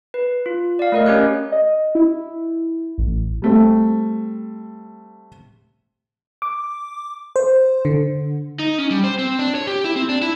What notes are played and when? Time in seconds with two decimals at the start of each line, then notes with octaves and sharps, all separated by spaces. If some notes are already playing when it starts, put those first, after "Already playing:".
0.14 B4
0.46 F4
0.79 D5 F5
0.92 A3 A#4 D#5
1.06 C#4 G4 C#5 F#6
1.52 D#5
1.95 E4
2.98 A1
3.42 G3 A3 C4
6.42 D6
7.36 C5
7.85 D3
8.59 D#4
8.79 C#4
8.91 G3
9.04 C5
9.19 C4
9.39 D4
9.55 C#5
9.67 G4
9.84 E4
9.96 C4
10.09 D4
10.22 E4